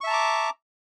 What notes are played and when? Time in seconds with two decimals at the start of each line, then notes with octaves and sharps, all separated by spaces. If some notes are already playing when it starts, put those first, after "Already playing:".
0.01 C#6
0.04 E5
0.07 A5
0.10 A#5
0.13 D6